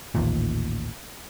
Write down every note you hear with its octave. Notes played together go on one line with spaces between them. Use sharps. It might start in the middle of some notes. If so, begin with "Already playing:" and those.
A1 D#2 A#2